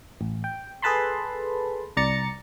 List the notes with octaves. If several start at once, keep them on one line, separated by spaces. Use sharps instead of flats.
A1
G5
G#4 A4 B4 A5 B5 C6
C2 D5 A#5 A6 C#7